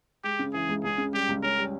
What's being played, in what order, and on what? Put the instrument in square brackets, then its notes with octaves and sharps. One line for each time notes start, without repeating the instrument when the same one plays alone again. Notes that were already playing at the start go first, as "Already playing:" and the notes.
[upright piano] G#3 [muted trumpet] G4
[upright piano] C#3
[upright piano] E3 [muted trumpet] G#4
[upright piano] C#2
[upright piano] C#2 [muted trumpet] G#4
[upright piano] C#3
[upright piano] G3 [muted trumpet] G4
[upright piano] C#2
[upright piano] C#4 [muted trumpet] A#4
[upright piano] G3